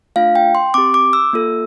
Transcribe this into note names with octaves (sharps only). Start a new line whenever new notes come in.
A3 D4 F4 F5
G5
C6
C4 G4 D6
D6
E6
A#3 F4 A4